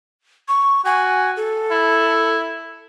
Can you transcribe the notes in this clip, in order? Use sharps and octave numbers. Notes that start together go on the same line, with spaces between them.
C#6
F#4 G#5
A4
E4